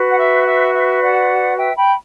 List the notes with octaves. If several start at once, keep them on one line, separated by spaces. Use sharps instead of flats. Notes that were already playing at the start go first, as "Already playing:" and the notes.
Already playing: F#4 B4
F#5
E5
E5
E5
D5 F#5
E5 G5
G5 B5